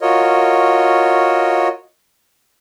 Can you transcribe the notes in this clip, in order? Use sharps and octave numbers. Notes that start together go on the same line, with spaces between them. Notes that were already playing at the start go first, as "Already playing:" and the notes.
F4 F#4 A#4 C#5 D#5